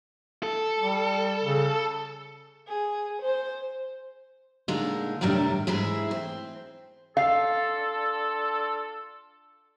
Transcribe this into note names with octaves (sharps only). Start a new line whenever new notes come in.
A4
G3
C#3
G#4
C5
A#2 D3 G#3 D#4
F#2 A2 C3 D#3 G3 D4
G#2 E3 G#3 E4 G#4
C4
D4 F4 A4 F5